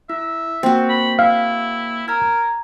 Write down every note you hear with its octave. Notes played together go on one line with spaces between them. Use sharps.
E4 E5
A#3 C4 F#4
B5
E4 F5
A#4 A#5 G#6